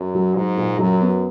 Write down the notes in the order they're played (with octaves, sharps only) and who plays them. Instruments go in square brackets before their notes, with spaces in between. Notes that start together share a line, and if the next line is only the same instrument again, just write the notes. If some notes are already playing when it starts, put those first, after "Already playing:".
Already playing: [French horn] F#2
[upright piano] F#3
[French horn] G#2 [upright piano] F#3
[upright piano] A#2
[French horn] F#2 [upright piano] F#3
[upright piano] B3